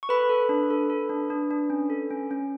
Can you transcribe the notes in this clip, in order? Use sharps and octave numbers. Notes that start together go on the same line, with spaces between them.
C#6
A4 B4 B5
A4
D4
A4
A4
D4
D4
D4
C#4
A4
C#4
C#4